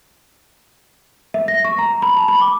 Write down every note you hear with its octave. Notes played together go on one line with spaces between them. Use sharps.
E5
A#6
C#6
A#5
B5
A5
B5
D6